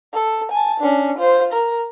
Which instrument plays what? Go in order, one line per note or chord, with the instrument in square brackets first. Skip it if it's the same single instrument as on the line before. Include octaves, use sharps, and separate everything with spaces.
[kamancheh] A4
G#5 A5
C#4 D4
F4 C5
A#4